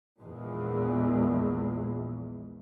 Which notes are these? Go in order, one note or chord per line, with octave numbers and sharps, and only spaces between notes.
A#1 E2 A#2 G#3